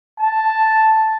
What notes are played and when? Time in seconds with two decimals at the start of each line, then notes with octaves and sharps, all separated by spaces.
0.19 A5